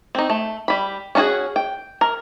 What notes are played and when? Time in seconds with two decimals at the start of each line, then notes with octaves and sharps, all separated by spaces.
0.15 C4 D#4
0.30 A3
0.68 G3 B5
1.15 C#4 D#4 F4 F#4 G#4
1.56 G5
2.01 A#4